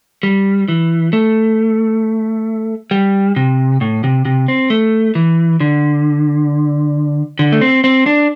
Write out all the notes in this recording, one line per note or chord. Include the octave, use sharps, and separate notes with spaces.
G3
E3
A3
G3
C3
A2
C3
C3
C4
A3
E3
D3
D3
A3
C4
C4
D4